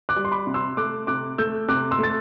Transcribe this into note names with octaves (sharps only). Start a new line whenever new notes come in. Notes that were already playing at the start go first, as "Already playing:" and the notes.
D6 F#6
G3
C6
B5 D6
C3
C6 E6
A3 D6 F#6
C3 D6 F#6
A3 E6 G6
C3 D6 F#6
C6 E6
A3 A6